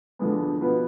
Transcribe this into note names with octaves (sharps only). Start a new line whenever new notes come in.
D2 D3 F3 G#3 B3
B2 B3 F4 B4